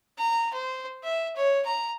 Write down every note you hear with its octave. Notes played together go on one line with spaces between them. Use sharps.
A#5
C5
E5
C#5
A#5